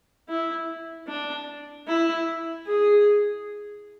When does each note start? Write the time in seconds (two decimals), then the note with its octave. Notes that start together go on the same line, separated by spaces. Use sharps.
0.29 E4
1.08 D4
1.88 E4
2.67 G#4